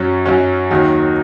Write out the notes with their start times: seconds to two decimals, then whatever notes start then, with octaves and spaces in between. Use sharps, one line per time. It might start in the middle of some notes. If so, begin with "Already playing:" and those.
Already playing: F#2 F#3 C#4
0.26 F#2 F#3 C#4
0.71 D#2 D#3 F#3